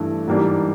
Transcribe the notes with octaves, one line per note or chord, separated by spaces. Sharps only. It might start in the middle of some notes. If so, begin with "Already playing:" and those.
Already playing: G2 E3 A3
G#2 E3 G3 A#3 D4